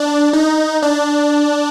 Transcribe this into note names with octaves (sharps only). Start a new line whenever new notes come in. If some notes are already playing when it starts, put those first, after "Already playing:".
Already playing: D4
D#4
D4